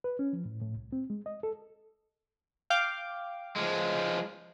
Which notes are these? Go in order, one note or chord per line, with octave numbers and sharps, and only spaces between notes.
B4
C#4
F3
A2
A2
C2
C4
G#3
D#5
A4
F5 G5 D6
F3 G#3